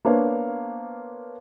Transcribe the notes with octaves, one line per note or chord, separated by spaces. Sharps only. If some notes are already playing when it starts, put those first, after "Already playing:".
A#3 B3 D4 C5 C#5 F5